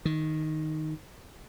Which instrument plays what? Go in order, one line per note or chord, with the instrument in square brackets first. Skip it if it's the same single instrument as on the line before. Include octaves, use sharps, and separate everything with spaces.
[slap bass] D#3